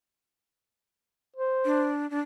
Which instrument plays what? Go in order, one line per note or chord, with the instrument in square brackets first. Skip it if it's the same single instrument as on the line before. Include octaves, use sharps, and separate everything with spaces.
[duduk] C5
[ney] D4
D4